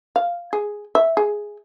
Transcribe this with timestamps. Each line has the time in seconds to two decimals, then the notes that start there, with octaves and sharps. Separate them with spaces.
0.16 F5
0.53 G#4
0.95 E5
1.17 G#4